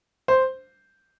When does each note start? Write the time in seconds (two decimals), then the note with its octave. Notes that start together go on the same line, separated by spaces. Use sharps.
0.28 C5